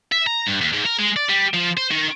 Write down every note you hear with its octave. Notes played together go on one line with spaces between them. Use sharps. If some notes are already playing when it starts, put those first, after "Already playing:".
E5
A#5
G2
D#2
G#2
A#4
G#3
D5
G3
F3
C5
D#3